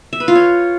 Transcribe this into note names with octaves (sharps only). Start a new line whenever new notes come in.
E5
B4
F4
C#5